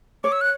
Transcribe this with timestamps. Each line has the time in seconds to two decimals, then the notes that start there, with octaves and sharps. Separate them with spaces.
0.24 C#5 D6
0.32 E6
0.41 F#6